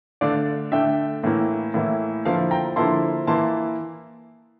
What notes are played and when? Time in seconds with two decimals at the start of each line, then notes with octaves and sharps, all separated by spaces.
0.21 D3 A3 D4 D5 F5
0.72 D3 A3 D4 E5 G5
1.24 A2 E3 A#3 E4
1.74 A2 E3 A#3 E4
2.25 D3 F3 A#3 E4 F5 A5
2.51 G5 A#5
2.76 D3 F3 A#3 E4 A5 C6
3.27 E3 A#3 E4 A5 C6